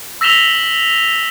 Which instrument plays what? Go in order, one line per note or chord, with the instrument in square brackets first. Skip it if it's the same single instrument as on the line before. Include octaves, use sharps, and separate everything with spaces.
[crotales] E6 A#6 B6 E7 F7 G7